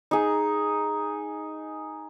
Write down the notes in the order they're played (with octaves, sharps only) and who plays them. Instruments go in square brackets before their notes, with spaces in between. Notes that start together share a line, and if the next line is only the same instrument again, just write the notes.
[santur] D#4 G#4